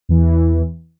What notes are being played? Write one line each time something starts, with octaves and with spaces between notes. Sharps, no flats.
E2 E3